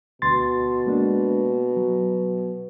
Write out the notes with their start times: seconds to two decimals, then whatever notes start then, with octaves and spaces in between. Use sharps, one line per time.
0.22 D2 B2 C6 A6
0.87 G#3 A#3 D4
1.76 F#3